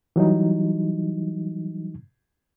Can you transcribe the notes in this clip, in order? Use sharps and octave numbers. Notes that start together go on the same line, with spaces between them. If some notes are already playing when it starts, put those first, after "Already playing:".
E3 F#3 G3 D#4